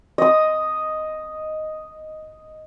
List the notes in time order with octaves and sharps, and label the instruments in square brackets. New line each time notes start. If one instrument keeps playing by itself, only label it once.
[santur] D#5 D#6